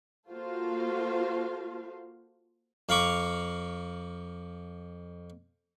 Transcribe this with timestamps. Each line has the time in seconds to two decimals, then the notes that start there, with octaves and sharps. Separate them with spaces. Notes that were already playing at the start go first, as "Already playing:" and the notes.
0.30 A#3 F4 F#4 A4 C5 F5
2.89 F2 F5 A#5 B5 C#6 D6